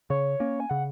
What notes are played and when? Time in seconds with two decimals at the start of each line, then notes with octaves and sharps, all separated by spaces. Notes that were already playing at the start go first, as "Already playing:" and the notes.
0.10 C#3 C#5
0.40 A#3 C#4
0.60 G#5
0.70 C#3 F#5